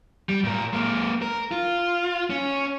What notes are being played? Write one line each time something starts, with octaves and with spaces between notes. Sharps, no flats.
G3
A2 A#4
G#3 A#3
A#4
F4
C#4